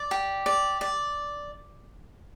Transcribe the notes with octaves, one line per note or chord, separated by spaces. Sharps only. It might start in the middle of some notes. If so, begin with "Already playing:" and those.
Already playing: D5
G4
D5
D5